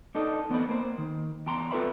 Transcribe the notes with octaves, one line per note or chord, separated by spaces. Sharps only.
D4 D#4 A4 D#5
E2 B3 C4 A4 D#5 B5
A#3 C5
D#3
E2 G5 A#5 C6
C4 F4 A4 B4 E5 B5